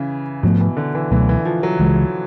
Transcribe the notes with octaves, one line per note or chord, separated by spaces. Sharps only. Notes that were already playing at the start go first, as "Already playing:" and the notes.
Already playing: C#3 E3
G#2 B2 F3 A3
E3
D3
E3
C#2 B2 E3 F#3 A3
E3
F3
F#3
C#2 C#3 E3 G#3